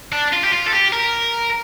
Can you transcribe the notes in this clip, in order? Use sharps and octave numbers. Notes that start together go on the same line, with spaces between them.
D4
F4
G4
F4
A4
G4
A#4